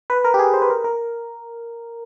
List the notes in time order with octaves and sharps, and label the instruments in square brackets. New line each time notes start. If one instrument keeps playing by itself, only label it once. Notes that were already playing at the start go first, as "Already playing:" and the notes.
[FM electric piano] B4
A#4
G4
G#4
C5
B4
A#4
A#4